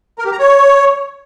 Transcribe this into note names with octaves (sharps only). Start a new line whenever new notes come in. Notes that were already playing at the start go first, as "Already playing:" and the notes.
A#4
G4
A#5
C#5